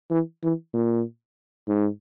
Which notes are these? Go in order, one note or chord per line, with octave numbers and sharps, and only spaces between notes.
E3
E3
A#2
G#2